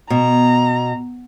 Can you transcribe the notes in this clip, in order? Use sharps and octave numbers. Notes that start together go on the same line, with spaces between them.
B2 A#5